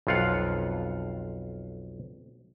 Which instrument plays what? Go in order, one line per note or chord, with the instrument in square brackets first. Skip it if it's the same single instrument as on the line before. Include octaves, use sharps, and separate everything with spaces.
[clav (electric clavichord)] B1 F2 F4 F5 F#5